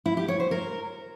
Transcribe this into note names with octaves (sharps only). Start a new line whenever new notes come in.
E4
G4
C#5
C5
A#4